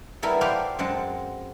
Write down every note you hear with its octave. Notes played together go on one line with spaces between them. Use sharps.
G3 B3 E4 A4 A#4
G4 A4 B4 C5 D5 F5
F#2 G#3 C4 F#5 A5